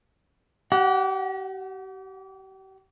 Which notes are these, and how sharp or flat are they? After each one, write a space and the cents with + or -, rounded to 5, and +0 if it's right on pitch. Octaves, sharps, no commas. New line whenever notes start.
G4 -35 F#5 +0